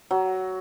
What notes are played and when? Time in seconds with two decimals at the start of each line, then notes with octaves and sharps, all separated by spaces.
0.11 F#3